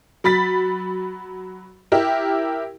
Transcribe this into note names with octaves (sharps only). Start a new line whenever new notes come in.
F#3 B5 A6 B6
E4 G4 A#4